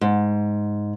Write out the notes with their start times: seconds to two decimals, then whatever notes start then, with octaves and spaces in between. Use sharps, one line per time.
0.01 G#2